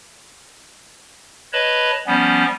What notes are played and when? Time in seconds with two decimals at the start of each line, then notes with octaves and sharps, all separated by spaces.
1.53 B4 C#5 D#5 A5 B5
2.07 F3 G3 B3 C#4